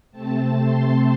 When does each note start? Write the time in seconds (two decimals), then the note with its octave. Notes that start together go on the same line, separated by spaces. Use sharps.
0.12 C3 A3 C4 A5
0.57 C6